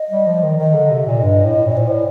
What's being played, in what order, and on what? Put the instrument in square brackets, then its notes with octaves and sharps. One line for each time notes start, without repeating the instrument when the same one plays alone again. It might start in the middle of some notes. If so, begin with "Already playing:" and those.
Already playing: [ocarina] D#5
[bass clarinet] G3
F3
D#3
[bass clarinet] D#3 [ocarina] D#5
[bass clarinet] D3
C3
A#2
G2
A2
A#2
[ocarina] C5
[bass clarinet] A2 [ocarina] D5